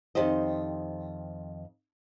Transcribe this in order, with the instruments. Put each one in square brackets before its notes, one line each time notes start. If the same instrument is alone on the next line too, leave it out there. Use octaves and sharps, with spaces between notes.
[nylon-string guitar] F2 D#3 G4 C5 D#5